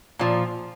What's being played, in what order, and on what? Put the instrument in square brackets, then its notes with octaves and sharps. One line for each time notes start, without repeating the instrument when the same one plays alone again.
[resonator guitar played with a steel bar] A#2 F3